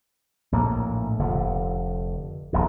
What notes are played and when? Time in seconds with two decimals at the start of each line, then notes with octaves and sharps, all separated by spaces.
0.52 A#1 A2 A#3
1.19 F1 D3
2.53 D#1 A#1 B2